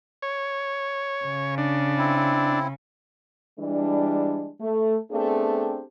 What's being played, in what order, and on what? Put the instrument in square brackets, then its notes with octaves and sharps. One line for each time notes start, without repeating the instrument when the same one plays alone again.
[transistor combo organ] C#5
[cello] C#3
[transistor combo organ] D4
[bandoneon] C4 E4
[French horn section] E3 G3 G#3 D4
A3
A3 B3 C4 D4 G4 G#4